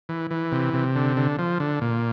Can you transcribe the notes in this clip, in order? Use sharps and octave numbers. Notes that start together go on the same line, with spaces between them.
E3
E3
C3
C3
D3
D3
F3
D3
A#2